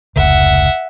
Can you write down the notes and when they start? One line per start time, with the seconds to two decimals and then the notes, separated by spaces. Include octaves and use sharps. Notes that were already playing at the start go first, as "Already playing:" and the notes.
0.16 F1 C#2 E5 F#5